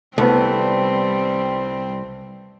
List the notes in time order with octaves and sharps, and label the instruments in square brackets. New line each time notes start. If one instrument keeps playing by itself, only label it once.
[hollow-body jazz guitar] C2 [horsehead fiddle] G3 C4 [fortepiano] A3 B3